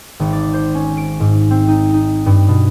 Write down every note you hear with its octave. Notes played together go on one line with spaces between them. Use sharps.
G#1
D5
C5
C#4
D7
G#2
C4
D#4
D#4
G2
B2